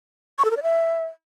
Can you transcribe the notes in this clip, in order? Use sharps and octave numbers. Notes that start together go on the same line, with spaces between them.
C#6
A4
A#4
D5
E5